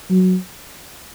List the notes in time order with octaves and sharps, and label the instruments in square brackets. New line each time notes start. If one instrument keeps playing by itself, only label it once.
[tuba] F#3